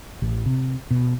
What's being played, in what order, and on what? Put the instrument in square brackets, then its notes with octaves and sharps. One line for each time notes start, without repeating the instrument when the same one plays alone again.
[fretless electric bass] A1
C3
B2